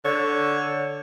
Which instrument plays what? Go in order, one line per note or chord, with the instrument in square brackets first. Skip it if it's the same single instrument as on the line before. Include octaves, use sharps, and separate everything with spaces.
[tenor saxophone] D3 [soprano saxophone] C#5